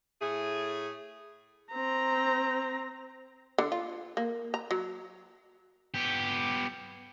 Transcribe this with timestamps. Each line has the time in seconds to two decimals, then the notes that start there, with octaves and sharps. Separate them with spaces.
0.21 A2 A3 G#4
1.74 C4 A#5
3.58 D3
3.72 F4
4.17 A#3
4.54 A#5
4.71 F#3
5.94 B3 G4